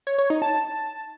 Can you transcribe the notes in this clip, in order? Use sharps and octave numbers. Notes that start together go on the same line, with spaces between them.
C#5
C#5
D#4
A5